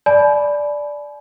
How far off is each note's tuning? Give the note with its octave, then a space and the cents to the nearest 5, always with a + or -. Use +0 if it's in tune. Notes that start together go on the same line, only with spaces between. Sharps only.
D5 +0 G#5 +45 B5 +0